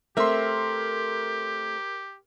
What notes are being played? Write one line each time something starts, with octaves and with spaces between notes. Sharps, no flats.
A3 C4 G4 A#4 E5 C6